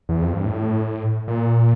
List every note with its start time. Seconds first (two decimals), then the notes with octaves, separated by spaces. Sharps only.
0.09 E2
0.22 F2
0.33 G2
0.46 A2
1.28 A#2